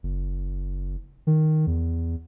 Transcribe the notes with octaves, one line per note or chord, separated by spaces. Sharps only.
F#1
D#3
E2